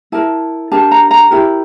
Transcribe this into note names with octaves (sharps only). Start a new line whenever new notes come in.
E4 A#4 A5
D4 G4 A#4 A5
A#5
A#5
E4 G4 A#4